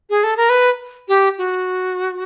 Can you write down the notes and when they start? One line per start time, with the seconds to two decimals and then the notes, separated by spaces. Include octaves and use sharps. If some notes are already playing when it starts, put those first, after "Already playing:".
0.10 G#4
0.23 A4
0.37 A#4
0.49 B4
1.08 G4
1.38 F#4